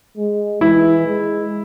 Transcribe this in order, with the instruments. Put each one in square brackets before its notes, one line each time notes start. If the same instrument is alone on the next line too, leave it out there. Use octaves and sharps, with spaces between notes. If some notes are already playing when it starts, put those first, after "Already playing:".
[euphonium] G#3
[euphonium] E3 [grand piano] E4
[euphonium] G#3